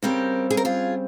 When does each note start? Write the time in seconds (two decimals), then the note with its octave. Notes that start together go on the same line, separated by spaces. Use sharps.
0.03 C#3 G3 C4 G4 A#4
0.50 G#4
0.57 A#4
0.65 F4 G#4